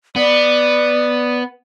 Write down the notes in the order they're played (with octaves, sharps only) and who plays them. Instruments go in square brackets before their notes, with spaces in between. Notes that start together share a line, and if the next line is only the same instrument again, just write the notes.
[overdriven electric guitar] B3 [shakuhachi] D5